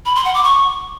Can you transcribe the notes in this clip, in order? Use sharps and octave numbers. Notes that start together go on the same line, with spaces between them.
B5
C6
F#5
D6
C#6